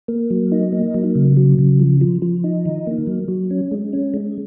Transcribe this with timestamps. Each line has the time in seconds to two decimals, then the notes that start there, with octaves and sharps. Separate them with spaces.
0.08 A#3
0.30 F#3
0.52 D#4
0.72 A#3
0.94 F#3
1.15 C#3
1.37 F#3
1.59 C#3
1.79 F3
2.01 F3
2.22 F3
2.44 D#4
2.65 D#3
2.87 A#3
3.07 F#3
3.28 F#3
3.51 C#4
3.71 G#3
3.93 C#4
4.14 G#3